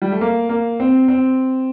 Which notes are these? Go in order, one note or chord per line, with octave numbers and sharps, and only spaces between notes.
G3
A3
A#3
A#3
C4
C4